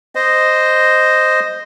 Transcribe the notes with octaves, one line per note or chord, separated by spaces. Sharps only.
C5 D#5